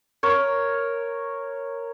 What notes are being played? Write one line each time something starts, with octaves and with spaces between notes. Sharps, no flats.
A#4 C#5